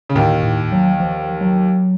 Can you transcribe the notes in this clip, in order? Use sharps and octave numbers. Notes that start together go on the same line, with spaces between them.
C#3
D#2 A2 D#3
A2
F#3
F3
F#3